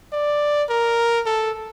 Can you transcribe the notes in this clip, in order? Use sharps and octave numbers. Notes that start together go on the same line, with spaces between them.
D5
A#4
A4